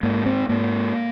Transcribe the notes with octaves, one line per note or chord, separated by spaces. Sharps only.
G#2 A#3
C4
G#2 A#3